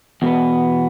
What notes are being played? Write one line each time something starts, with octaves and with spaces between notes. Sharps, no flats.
E2 B2 B3